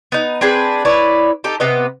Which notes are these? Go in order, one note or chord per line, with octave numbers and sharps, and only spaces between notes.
B3 D#4
C4 D4 G#4 B4
E4 B4 C#5 D5
D#4 G4 A4
C3 B3 B4 D#5